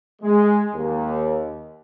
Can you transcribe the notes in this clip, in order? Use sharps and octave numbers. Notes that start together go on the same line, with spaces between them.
G#3
D#2